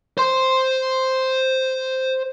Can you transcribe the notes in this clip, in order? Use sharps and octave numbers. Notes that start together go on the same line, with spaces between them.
C5 C6